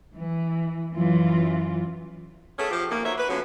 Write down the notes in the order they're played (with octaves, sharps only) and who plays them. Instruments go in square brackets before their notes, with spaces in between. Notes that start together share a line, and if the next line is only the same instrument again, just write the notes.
[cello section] E3
F#2 E3 F4
[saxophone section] A3 B3 C#4 G#4 A4
F3 G4
A#2 D#3 A3 A#3
D#4 F#4 C5 C#5 E5
B4
D3 F3 F#3 B3 C#4